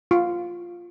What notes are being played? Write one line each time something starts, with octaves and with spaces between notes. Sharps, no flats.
F4